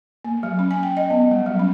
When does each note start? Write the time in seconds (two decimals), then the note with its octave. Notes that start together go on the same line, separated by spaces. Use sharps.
0.25 A#3
0.43 F#3
0.59 C#4
0.71 G#5
0.83 G5
0.97 D#5
1.10 B3
1.31 G3
1.46 F#3
1.59 C#4